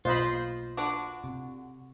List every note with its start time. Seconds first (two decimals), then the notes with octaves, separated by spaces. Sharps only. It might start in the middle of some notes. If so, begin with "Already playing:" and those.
0.05 B1 B2 A#3 F4 C5 D#5 B5
0.77 D3 D4 F#4 D6
1.24 C3